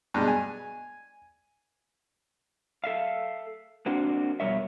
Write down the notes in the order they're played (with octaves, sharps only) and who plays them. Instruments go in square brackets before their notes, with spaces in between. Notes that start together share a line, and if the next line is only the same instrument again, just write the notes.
[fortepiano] G2 B2 G#3
G#5
[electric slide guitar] A4 E5 F5
A#3 C4 D4 F#4
F2 B2 G3 A#4 C#5 E5